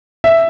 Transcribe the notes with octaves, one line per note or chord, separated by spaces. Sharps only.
E5